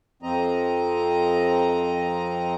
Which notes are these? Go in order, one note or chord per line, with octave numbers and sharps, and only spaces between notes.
F2 F3 C4 D#5 A#5